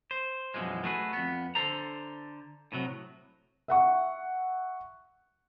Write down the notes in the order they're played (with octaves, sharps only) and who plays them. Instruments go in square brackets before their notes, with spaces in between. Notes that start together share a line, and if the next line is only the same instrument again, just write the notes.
[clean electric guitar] C5
F#2 B2 E3 F3 G#3
A3 F#4 G#4 B4
F2 B3
D3 A4 C5 A#5
A2 C3 F#3
[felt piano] E5 F#5 C#6